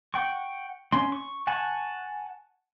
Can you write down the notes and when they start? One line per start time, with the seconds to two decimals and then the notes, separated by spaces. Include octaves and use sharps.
0.14 F#5 G5 C#6
0.92 C#4 C6
1.12 C#6
1.47 F#5 G#5 A5 C#6